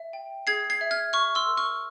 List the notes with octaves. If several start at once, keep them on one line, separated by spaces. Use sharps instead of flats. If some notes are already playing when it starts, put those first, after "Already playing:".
Already playing: E5
G5
G#4 G#6 C7
G#6 C7
E5
F6 G#6
E5 C#6 F6
C6 E6
A#4
C#6 F6